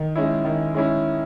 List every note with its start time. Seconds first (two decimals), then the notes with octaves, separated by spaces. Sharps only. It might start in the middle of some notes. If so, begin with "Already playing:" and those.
Already playing: D#3
0.16 G#3 C#4 E4
0.45 D#3
0.74 G#3 C#4 E4